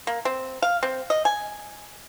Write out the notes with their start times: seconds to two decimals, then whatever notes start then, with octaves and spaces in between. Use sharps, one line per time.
0.07 A#3
0.25 C4
0.62 F5
0.83 C4
1.10 D#5
1.25 G#5